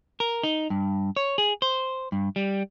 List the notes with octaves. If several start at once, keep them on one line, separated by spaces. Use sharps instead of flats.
A#4
D#4
G2
C#5
G#4
C5
G2
G3